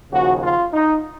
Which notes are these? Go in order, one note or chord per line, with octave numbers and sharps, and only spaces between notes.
D#2 C#3 F3 F#4
F4
D#4